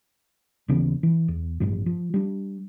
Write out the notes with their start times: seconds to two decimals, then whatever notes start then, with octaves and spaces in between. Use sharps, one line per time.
0.68 D#2 C#3 E3 B3
1.03 E3
1.28 E2
1.60 A1 G2 F3
1.86 F3
2.14 G3 D4